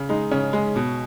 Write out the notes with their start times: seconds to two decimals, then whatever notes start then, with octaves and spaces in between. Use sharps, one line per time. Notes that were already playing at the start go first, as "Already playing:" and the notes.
Already playing: C#3
0.09 G#3 D#4
0.31 C#3 C#4
0.53 G#3
0.76 B2